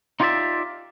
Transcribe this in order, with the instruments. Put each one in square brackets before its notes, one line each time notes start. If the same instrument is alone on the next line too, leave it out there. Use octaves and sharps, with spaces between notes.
[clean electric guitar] D#4 F4 G4 C#5 D5 E5